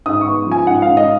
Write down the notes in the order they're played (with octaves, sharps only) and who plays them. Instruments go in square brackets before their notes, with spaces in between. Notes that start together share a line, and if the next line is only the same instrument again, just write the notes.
[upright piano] G#2 D#6
C#6
B3
F3 G#5
G#2 F#5
G#2 F5
D#5